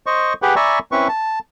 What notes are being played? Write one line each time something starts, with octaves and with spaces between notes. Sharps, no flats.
C5 D#5 C#6
G4 G#4 B4 F#5 G5
D5 E5 G#5 A#5 B5 C#6
C4 C#4 E4 B4 C#6
A5